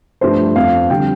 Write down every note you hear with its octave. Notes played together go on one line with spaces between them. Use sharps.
G2 F3 A3 C5
F2 F3 C4 F5
F2 D3 G3 G5